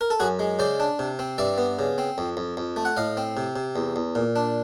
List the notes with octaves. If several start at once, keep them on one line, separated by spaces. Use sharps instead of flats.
A#4
A4
F#2 F#4 G#4
G#3
C#3 C5 D5
D4
C3
C4
G2 D5 E5
B3
C#3
C4
F2
F2
F2
A3
F#5
A2 D#5 F5
C4
C3
C3
E2
E2
A#2
D4